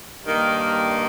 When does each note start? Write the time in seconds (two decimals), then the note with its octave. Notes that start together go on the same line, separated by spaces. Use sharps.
0.24 G2 D#3 A#3